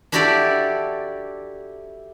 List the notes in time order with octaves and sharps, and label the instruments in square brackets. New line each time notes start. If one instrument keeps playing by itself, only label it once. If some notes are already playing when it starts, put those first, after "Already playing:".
[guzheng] D4 E4 F#4 G4 A4 D5